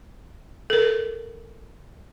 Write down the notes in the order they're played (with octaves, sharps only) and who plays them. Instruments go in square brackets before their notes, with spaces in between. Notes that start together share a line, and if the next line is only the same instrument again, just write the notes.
[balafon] A4 A#4